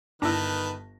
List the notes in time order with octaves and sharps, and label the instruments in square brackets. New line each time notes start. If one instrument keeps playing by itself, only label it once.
[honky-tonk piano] G1 A5 A#6 [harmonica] D#3 B4 [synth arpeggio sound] D4 E4